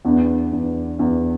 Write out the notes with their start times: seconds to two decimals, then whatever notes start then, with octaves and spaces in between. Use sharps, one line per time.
0.05 E2 B3 D4
0.52 E2
0.99 E2